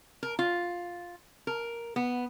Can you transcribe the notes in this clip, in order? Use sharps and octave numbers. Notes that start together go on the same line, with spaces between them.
A#4
F4
A#4
B3